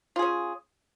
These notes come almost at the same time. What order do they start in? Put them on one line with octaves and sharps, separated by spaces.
F4 G#4 C#4